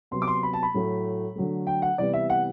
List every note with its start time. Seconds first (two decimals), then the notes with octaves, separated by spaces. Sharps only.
0.11 C3 F#3 B3 C6
0.22 D6
0.28 C6
0.43 B5
0.53 A5
0.63 B5
0.74 A2 F#3 A3
1.35 D3 F#3 A3
1.67 G5
1.82 F#5
1.98 C3 E3 G3 B3 D5
2.13 E5
2.30 F#5